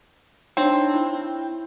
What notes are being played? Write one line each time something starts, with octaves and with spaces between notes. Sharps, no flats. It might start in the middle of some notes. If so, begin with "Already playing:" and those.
C4 D4 D#4 C#5
E4